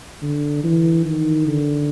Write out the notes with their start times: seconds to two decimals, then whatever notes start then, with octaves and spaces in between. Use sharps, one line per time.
0.22 D3
0.64 E3
1.06 D#3
1.48 D3